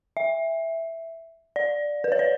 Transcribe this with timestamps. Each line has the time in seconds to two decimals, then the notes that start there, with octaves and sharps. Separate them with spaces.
0.17 E5
1.56 D5
2.04 B4
2.12 C#5
2.19 D5